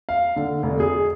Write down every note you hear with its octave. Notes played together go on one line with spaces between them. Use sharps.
F5
D3
F1
G#4